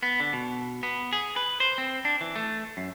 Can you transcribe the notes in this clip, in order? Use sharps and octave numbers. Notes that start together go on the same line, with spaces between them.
B3
D3
B2
B3
G#4
B4
C5
C4
D4
E3
A3
F#2